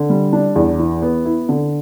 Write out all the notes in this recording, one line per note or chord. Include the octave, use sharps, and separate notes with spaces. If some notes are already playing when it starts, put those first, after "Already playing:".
Already playing: D3
G3
D4
E2
E3
B3
E4
D3